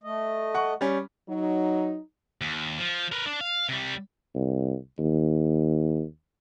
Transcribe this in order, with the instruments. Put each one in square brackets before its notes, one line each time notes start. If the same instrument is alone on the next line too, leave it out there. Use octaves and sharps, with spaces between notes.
[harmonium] A3 D#5
[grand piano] F#5 C#6
G3 C#4
[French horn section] F#3 D#4
[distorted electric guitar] D#2
F3
A#4 B4
D4
F5
C3 G3
[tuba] C2
D#2